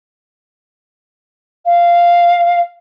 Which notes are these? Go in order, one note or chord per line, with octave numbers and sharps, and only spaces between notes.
F5